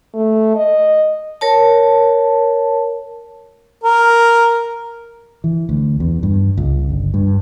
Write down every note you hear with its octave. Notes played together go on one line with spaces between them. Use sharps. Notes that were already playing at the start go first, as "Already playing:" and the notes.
A3
D#5
A#4 C#5 A5
A#4
E3
D2
E2
G2
C#2
G1
G2